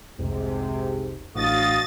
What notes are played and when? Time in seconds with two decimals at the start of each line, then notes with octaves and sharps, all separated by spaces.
0.19 F1 C2 G#2 C3
1.35 A1 D2 A2 F#4 D#5 F5 D#6 A6